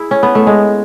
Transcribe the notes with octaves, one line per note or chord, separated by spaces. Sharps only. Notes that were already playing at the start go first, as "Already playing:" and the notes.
Already playing: E4 G#4
C#4
B3
A3
G#3